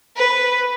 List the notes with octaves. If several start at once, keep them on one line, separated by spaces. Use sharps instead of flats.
B4